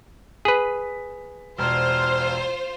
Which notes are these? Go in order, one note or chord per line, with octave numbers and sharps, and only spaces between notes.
G#4 B4 B6
E1 F4 C5 F6